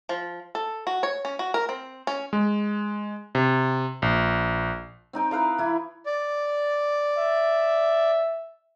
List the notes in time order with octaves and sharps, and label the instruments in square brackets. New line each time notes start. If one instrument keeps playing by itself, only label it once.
[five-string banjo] F3
A4
F#4
C#5
C#4
F#4
A#4
C4
C#4
[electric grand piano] G#3
C3
A#1
[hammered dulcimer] C4 D#4 G5
E4 B4 F5 A#5
E3 E4
[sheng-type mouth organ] D5
[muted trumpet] E5